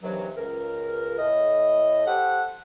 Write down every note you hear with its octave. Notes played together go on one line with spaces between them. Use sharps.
G2 C3 D#3 E3 F#3
C#2 A#4
A2 D#5
G4 A4 C5 F#5